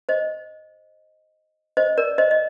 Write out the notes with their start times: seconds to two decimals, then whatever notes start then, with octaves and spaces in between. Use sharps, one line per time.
0.09 C5 D#5
1.77 C5 D#5
1.97 A#4 D5
2.18 C5 D#5
2.31 D#5